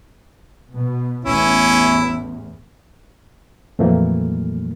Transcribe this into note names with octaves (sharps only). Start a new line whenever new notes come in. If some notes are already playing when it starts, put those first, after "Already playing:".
B2
A1 E2 C#4 E4
F2 A#2 E3 F#3 A3 A#3